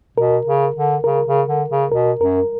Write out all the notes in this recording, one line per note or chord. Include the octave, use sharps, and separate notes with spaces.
B2 A#4
C#3
D3
C#3 A#4
C#3
D3
C#3
B2 A#4
F#2 A#4